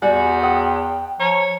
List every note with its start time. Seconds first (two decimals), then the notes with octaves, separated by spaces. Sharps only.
0.02 E2 G3 F#4 G#5
0.43 F#5 G5 D#6
0.63 G5
1.20 F3 C#5 A#5